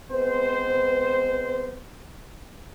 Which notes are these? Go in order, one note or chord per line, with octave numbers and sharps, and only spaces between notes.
G#3 B3 C4 B4 C5